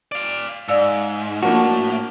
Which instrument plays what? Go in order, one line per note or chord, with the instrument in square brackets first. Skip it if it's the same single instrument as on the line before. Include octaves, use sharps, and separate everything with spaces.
[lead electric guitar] D5 F5
[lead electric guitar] G#2 [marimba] D5 F5 E6
[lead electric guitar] A2 [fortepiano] F3 A#3 D4 [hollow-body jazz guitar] F#4